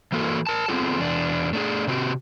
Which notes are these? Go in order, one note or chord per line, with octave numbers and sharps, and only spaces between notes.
E3 A#3 F#4 A4 A#4
A#4 A5
B3 C4 F4 G#4 A4
E2 D4
A3 D4 G#4
C3 C4 F#4 G4